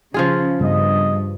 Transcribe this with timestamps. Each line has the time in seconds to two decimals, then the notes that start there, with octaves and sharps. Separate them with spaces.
0.14 C#3 F3 F4 G#4
0.61 G2 C#3 G3 B3 D#5